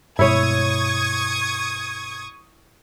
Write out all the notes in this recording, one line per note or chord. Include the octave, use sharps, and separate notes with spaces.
G2 B2 G#3 E4 C#5 C#6 D#6 G#6